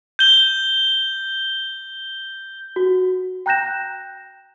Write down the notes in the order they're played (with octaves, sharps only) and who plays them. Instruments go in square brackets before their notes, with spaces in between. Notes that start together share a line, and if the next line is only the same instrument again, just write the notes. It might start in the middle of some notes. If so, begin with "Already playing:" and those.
[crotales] G6 G7
[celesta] F#4
G5 A#5 F#6 G6 A#6 E7